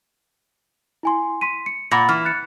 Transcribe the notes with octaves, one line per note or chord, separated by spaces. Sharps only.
E4 G#5 C6
C6 B6 D#7
C#7
A#2 F#5 B5 A#6
E3 F6
F#6 A6 C#7